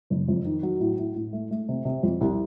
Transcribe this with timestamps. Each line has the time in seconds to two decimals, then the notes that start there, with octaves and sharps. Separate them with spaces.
0.10 F#1
0.28 F2
0.45 D#3
0.63 F#3
0.80 A2
0.98 A2
1.16 A2
1.33 A3
1.51 A3
1.69 C3
1.85 C3
2.03 F2
2.21 C2